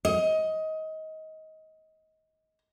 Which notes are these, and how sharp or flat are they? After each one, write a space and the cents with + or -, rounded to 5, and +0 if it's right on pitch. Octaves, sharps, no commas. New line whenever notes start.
D#5 +20